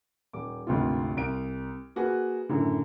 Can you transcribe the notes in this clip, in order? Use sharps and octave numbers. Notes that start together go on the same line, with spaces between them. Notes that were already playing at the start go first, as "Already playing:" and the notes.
D#1 D6
G#1 D2 C3 F4
C2 D7
A#3 F#4 G#4 B4
F#2 A2 D3